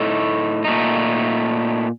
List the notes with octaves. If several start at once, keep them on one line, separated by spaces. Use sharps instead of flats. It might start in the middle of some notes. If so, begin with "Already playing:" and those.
Already playing: A2 A3 D#4 A4
A#2 A3 D#4